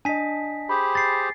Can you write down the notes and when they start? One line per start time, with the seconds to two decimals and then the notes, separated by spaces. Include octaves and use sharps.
0.05 D4 D#5 G#5 B6
0.69 G4 G#4 C5 B5
0.95 A6 C7